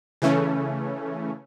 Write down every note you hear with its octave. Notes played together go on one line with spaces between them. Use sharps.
C#3 E3 A3 C#4